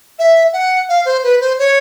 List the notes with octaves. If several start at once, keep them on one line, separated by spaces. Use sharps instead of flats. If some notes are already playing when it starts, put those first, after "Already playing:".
E5
F#5
F5
C5
B4
C5
C#5